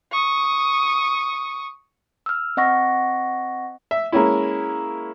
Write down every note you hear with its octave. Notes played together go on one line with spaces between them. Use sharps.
C#6 D#6
E6 F6
C4 D#5 F#5 C#6 A#6
E5
G#3 A#3 C#4 E4